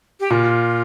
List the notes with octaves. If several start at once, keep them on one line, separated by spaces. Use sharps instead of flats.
G4
A#2 F4